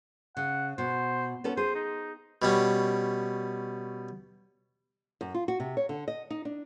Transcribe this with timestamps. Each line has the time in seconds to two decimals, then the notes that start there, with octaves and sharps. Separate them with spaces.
0.37 C#3 F#5
0.78 B2 C5
1.44 B3 C#4 A4
1.57 G#4 C5
1.75 D#4
2.42 B2 G3 C#4
5.21 F#2
5.34 F4
5.48 F#4
5.60 C3
5.77 C#5
5.89 D3
6.08 D#5
6.30 D#4
6.45 D4